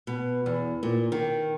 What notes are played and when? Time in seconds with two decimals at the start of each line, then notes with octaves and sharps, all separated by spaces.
0.07 B2
0.46 E2
0.83 A#2
1.12 D#3